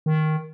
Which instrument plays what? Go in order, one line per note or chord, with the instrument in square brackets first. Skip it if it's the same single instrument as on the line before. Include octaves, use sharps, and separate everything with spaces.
[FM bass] D#3